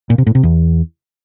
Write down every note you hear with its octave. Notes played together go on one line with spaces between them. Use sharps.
A#2
C3
A2
C3
E2